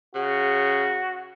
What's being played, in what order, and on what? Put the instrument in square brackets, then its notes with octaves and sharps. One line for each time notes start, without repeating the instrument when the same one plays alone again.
[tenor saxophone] C#3 [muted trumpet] F#4